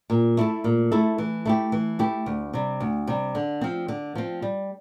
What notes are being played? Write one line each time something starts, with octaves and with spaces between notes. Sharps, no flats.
A#2
A3 E4 A4
A#2
A3 E4 A4
E3
A3 E4 G4
E3
A3 E4 G4
D2
C3 G3
D2
C3 G3
D3
F3 C4
D3
F3 C4
G3